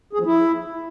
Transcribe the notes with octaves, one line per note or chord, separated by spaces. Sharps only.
G#4
F3
E4